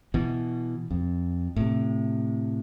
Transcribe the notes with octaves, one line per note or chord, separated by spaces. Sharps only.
B2 E3
F2
A2 C3